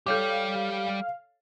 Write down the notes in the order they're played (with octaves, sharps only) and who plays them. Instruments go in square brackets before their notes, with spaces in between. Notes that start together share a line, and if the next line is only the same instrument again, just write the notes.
[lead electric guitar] G3 G4 [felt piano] A4 C#5 [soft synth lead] F5 [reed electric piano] D6 G6